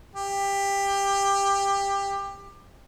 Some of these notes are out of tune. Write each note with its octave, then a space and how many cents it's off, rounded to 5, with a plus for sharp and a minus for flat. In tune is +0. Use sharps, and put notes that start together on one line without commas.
G4 +20